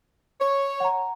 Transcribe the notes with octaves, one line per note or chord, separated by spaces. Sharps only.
C#5
F#5 A#5